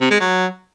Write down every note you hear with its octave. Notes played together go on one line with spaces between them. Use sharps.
C3
G#3
F#3